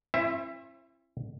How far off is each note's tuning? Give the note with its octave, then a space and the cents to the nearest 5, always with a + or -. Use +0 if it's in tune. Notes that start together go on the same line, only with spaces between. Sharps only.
C4 +45 E4 +35 E5 +0